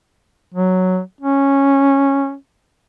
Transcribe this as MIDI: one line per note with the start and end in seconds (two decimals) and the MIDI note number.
0.54 0.99 54
1.21 2.34 61